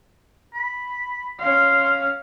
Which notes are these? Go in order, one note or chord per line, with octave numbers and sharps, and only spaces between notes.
B5
C#4 F5 C6